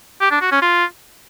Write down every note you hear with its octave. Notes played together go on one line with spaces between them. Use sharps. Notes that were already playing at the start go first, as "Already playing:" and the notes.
G4
D4
F#4
C#4
F4